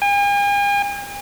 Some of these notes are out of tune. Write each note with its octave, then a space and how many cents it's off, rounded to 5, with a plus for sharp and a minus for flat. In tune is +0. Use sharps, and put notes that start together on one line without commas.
G#5 -45